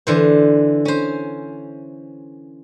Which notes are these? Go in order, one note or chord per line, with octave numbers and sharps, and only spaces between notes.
D3 E3 C5
C#4 C5